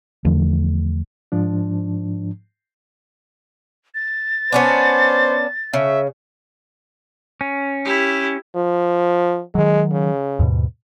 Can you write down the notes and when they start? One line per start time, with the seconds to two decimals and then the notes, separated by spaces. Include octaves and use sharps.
0.25 E2 D3 F3 A3
1.32 G#2 F3 D4
3.95 A6
4.52 B3 C#4 D4 C5
5.73 C#3 E5
7.41 C#4
7.85 E4 G4
8.55 F3
9.55 D#3 F#3 G#3
9.92 C#3
10.39 D#2 G#2 B2